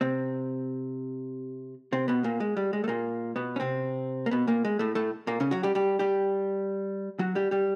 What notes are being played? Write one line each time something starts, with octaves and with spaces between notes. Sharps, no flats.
C3 C4
C3 C4
B2 B3
A#2 A#3
G#3
G3
G#3
A3
A#2 A#3
B2 B3
C#4
C3 C4
A#3
B2 B3
A#2 A#3
G#3
A2 A3
A2 A3
A#2 A#3
C#3 C#4
F#3 F#4
G3 G4
G3 G4
G3 G4
F#3 F#4
G3 G4
G3 G4